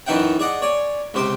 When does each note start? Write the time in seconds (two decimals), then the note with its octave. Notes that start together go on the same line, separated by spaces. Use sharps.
0.06 F#2 E3 D#4 E5 F#5 G5
0.40 G#4 D5 D#5 F#5
0.62 C#5 D5 G#5
1.14 C#2 C3 C5 D6